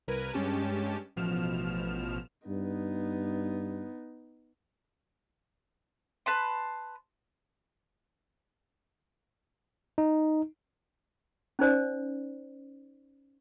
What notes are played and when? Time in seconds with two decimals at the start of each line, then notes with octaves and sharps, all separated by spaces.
0.08 C2 A#4 B4 G#6 D#7
0.34 G2 G#3 C#4 G4 A5
1.16 A1 B2 F3 F6 E7
2.48 G2 B3 D#4
6.26 B4 A5 C6
9.98 D#4
11.59 C#4 D#4 C5 D5